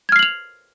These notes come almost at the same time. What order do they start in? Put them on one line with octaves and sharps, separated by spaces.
G#6 F6 C7 F#7 F7